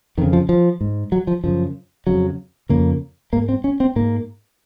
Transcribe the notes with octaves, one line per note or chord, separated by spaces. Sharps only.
F2 C#3 D#3
F3
F3
G#2
F#3
F3
F#2 C#3 F3
F2 C#3 F#3
F2 C#3 A#3
G#2 A#3
C4
C#4
C4
G#2 A#3